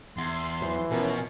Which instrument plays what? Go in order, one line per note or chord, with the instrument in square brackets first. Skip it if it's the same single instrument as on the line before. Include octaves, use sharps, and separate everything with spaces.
[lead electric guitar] E2 [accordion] C6
[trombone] E3 [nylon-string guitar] F#3 C5
[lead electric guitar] B2 [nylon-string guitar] F3 A#4 [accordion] C#4